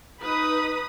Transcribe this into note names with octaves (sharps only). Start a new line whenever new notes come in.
D#4 B4 B5 D#6